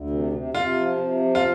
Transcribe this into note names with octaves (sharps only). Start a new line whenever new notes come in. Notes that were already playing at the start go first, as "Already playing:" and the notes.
Already playing: D2
C3
C3
C3 F4
F3
C3
F3
F4